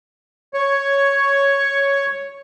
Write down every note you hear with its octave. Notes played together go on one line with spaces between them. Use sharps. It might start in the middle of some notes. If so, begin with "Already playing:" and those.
C#5 C#6